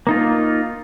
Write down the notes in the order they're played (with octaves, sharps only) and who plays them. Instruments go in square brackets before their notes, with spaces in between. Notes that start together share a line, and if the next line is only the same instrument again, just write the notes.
[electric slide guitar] A#3 D#4 F4